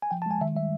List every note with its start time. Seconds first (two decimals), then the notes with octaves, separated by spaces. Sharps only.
0.02 G#5
0.11 F3 G5
0.22 A5
0.26 G#3 G#5
0.41 D#3 E5
0.55 G3 E5